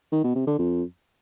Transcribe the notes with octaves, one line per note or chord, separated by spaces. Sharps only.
D#3
B2
C3
D3
F2